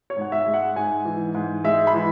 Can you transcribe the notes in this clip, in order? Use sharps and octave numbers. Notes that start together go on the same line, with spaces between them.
C#5
G#2 F#5
E5
G#3
F#5
G#2 G#5
E3
G#2
G#3 E5
B5
E3